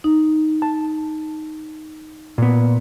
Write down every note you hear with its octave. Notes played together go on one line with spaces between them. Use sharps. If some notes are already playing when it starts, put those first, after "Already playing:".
D#4
A5
A#2 B3